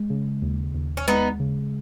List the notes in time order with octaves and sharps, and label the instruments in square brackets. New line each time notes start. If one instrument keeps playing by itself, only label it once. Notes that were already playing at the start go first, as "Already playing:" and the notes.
Already playing: [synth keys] G#3
C#3
D#2
D#2
[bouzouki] C#4
[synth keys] G#3 [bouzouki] B3 D#4
[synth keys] C#3